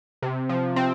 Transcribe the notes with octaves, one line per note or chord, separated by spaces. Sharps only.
C3
F3
C4